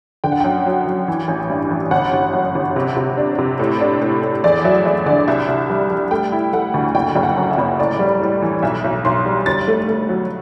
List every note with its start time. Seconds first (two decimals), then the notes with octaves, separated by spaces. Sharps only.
0.24 D3 G5
0.32 F#5
0.40 F#2 G5
0.66 F#3
0.87 F#3
1.08 E3
1.28 A1
1.50 G2
1.71 A1
1.91 G1 F#5
2.13 G1
2.33 F#2
2.55 G1
2.76 C3
2.97 C3
3.17 D4
3.38 C3
3.59 A2
3.81 D4
4.01 A2
4.23 A2
4.44 E2 D5
4.64 F#3 E5
4.85 E2 D5
5.06 D3 D5
5.28 C2 E5
5.48 C2
5.70 G3
5.90 G3
6.11 A3 G5
6.32 E4
6.53 A3 F#5
6.74 D2
6.95 F#1 G5
7.16 F#1
7.23 F#5
7.37 F#2
7.51 E5
7.58 F#1
7.79 A2 D5
7.99 G3
8.21 A2
8.42 E3
8.63 B1 E5
8.84 B1
9.05 B1 C6
9.26 G3
9.46 G1 A6
9.68 A3
9.88 A3
10.09 F#3